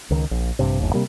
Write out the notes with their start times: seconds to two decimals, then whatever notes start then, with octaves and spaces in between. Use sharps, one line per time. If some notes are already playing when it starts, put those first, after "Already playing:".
0.10 C#2 D#3
0.31 A#1
0.59 A#1 G2 C3
0.80 G1 D#2
0.94 C3 G3 A#3